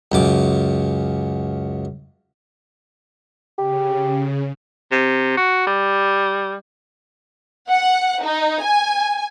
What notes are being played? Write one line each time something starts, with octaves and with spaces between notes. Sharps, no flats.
C#2 F#2 D6
C#3 G4
C3
F#4
G3
F#5
D#4
G#5